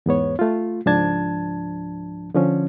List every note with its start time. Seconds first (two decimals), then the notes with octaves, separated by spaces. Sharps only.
0.06 E2 G#2 B3 C#5
0.39 A3 F4
0.86 C#2 G#2 F3 D4 A5 G#6
2.34 D3 F3 C#4